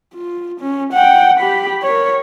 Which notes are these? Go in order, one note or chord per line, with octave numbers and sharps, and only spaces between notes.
F4
C#4
F#5 G5
G4 B5
A#4 C#5